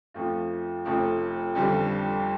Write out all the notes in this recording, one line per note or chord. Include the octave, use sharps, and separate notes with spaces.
F2 F3 A3 F4
F1 F2 F3 A3
G1 F2 D3 G3